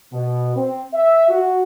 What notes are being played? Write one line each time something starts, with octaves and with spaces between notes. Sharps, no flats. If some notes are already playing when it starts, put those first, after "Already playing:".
B2
C4
E5
F#4